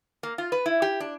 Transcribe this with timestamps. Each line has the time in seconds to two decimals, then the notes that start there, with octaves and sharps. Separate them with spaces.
0.23 A#3
0.38 F4
0.52 B4
0.66 E4
0.82 G4
1.00 D4